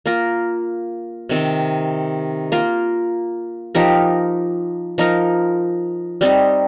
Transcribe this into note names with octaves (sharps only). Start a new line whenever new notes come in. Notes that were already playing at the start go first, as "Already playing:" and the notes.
A#3 F4 A#4
C3 D#3 C4
A#3 F4 A#4
F3 D#4 G4 A#4
F3 D#4 A#4
G3 C4 D#4